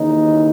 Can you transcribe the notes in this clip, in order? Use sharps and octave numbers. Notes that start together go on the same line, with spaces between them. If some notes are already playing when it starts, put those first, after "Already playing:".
Already playing: D#2 C#3 E3 D#4